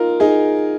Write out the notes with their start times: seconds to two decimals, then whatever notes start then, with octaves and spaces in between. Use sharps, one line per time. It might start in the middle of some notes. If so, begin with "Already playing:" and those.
Already playing: D#4 F4 A#4
0.20 D#4 G#4